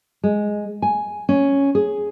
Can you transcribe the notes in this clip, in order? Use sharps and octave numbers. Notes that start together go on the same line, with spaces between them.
G#3
G#5
C#4
G#4